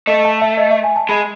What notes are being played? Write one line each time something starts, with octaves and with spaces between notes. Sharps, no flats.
A3 D#5
A5
E5
D#5
E5
G#5
A5
G#3 B5